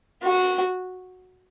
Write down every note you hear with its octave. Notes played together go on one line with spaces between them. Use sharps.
F#4